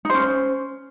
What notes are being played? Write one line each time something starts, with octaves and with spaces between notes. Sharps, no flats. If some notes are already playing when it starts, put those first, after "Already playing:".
C#4 D#4 C5